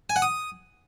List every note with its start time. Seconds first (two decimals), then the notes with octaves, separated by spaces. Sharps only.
0.10 G#5
0.16 F#5
0.22 D#6